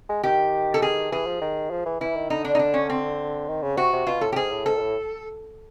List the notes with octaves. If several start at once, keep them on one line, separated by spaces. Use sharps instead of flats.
G#3
D#3 G4
A4
G#4
E3 G#4
F3
D#3
F3
E3
E3 E4
D#3
D3 D#4
D4
D#4
D4
C#4
C4
D#3
C#3
C3 F#4
C3
B2 F4
A2 A4
G4
G#2 G#4
A2
G#2 A4
A#2
A2